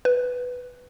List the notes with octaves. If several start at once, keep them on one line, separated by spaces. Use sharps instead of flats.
B4